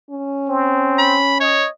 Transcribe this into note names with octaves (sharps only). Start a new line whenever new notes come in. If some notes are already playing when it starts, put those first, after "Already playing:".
C#4
C4
B5
C#5 D#5